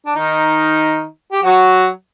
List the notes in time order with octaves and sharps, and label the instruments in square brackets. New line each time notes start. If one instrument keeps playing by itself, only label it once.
[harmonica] D4
D#3 D#4
G4
F#3 F#4